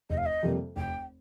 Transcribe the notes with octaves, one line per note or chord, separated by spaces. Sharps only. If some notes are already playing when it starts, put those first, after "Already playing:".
F1 D#5
F5
D#5
F2 C3 G3 A#3
F1 G5